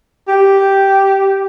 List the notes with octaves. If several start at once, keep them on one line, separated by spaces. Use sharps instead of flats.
G4